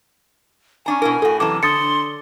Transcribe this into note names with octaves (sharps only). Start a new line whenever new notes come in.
C#4 D4 G#5 A#5
B2 E4 A#4
A2 F#4 A4
F#2 C3 E3 A5 D6
D3 C6 D#6 A6 C#7